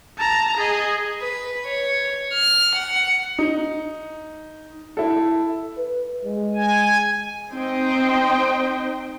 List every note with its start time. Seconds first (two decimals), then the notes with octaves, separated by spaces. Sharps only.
0.18 A5 A#5
0.57 G#4 D#5
1.21 B4
1.65 C#5
2.33 F6
2.76 F#5
3.39 D#4
4.97 E4 A4
5.77 B4
6.25 G#3
6.54 G#5
7.52 C4 D#4 C5 D#5 G5